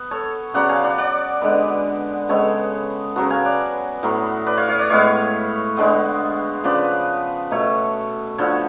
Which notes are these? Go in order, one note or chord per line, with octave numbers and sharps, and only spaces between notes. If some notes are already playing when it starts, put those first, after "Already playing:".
Already playing: B3
A4 C#5
C#3 F#3 B3 D5 F#5
F5 G#5
D5 F#5
D5 F#5
D3 G#3 B3 B4 D5
C#3 G#3 B3 A4 C#5
C#3 F#3 B3 F#4 A4
F5 G#5
D5 F#5
A2 F#3 B3
B4 D5
C#5 F5
C#5 F5
D5 F#5
A2 G#3 B3 C#5 F5
D3 G#3 B3
C#3 F3 B3 B4 D5
B2 A3 A4 C#5
D3 F3 B3 A4 C#5